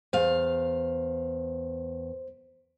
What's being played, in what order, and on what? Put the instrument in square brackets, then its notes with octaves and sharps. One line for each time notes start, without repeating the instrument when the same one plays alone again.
[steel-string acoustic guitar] E2 F5 [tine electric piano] C5